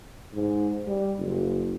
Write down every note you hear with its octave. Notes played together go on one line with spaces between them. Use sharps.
G#2
G3
F#1